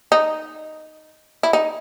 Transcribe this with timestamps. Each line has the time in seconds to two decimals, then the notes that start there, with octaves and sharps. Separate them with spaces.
0.12 D#4
1.43 E4
1.53 D#4